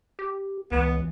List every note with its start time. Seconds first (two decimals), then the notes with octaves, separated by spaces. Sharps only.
0.19 G4
0.72 C#2 E3 B3